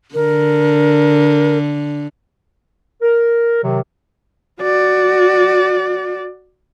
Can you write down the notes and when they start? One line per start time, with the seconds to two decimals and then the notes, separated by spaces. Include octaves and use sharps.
0.14 D3 A#4
3.02 A#4
3.64 C3 D#3 F#3
4.61 F#4 D5